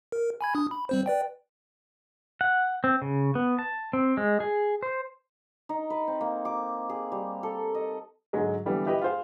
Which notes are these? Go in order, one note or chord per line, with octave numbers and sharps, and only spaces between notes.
A#4
G#5 B5 G#6
D4 D#6
B5
G3 C4 C5
B4 D5 G5
F#5
C4
C#3
B3
A5
C4
G#3
G#4
C5
D#4
B4
C4
A#3
D6
G#4
G3
A4
D#5
G#2 D3 F#3 G#3
D3 E3 G3 B3
E4 G4 B4 D#5
F4 G#4 C5 F5